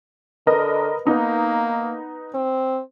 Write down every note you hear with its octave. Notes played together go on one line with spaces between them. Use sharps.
D3 A#4 B4 D#5
A#3 B3 D#4
C4